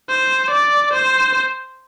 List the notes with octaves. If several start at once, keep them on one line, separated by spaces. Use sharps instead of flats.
C5
D5
C5